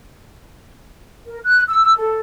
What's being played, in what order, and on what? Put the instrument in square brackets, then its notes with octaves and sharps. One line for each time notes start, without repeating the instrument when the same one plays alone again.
[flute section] A#4
F#6
E6
A4